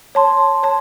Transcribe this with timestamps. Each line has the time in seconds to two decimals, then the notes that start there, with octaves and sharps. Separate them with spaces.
0.15 C#5 A5 C6
0.63 C#5 A5